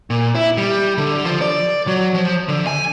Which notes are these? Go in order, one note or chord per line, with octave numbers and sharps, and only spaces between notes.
A#2
E4
G3
D3
F3
D5
F#3
F3
D3
G#5